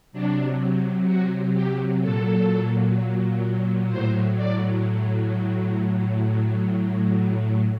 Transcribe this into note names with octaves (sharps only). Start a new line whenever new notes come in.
C3 F#3 D4
F#4
G4
A#2 F#3 A4
A2 F#3 C5
D5
A2 F#3